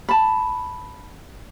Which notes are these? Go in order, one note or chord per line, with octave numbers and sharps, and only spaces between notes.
A5 B5